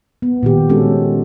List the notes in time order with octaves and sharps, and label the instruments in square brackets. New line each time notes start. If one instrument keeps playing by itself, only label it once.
[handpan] B3
A#2 D#3 G4
G#3 C4 C#4 F4 F#4 A4